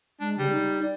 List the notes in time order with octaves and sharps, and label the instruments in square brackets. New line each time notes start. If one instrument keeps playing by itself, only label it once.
[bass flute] G#3 [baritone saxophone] D4
[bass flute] C#3 [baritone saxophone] G3
[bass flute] D#4
D5